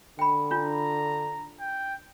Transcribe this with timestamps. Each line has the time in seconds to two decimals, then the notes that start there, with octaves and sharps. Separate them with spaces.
0.19 D3 G5 B5
0.51 D4 F4 A#5
1.60 G5